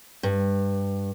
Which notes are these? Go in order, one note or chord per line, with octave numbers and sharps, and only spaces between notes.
G2